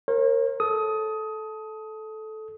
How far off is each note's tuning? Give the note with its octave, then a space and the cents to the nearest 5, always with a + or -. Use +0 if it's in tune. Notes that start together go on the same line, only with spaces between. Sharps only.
A#4 +0 C#5 -45
A4 -15 D#6 +20